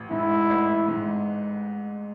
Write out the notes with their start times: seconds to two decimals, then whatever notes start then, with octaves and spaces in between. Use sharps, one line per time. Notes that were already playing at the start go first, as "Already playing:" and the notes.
Already playing: A1
0.11 G#2 E4
0.50 A1
0.88 G#2